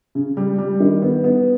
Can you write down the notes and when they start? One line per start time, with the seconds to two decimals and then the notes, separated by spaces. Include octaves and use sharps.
0.15 C#3
0.37 G3
0.58 G3
0.80 D#3
1.02 B3
1.24 B3